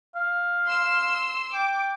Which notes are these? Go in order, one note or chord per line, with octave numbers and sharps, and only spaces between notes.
F5
C6 E6
G5 D6